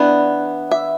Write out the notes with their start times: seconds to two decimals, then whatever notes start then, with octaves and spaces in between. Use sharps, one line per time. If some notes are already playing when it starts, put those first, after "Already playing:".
Already playing: E3 B3 D4 F#5
0.71 E5